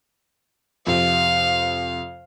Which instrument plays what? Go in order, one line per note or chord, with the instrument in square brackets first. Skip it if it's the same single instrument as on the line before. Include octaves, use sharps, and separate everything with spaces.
[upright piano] F2 C3 [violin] F5